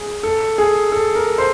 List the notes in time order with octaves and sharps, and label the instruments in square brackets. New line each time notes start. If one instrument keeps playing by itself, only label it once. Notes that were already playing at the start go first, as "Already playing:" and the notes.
Already playing: [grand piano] G#4
A4
G#4
A4
A#4
C5